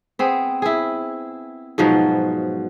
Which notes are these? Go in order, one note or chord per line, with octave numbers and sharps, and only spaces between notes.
B3 C4 G#4
E4 G#4
G#2 B2 F3 F#3